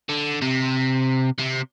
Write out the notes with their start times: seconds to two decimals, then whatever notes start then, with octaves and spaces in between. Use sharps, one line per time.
0.09 D3
0.42 C3
1.39 C3